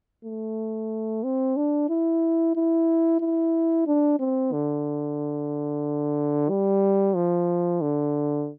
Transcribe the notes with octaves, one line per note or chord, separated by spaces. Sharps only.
A3
C4
D4
E4
E4
E4
D4
C4
D3
G3
F3
D3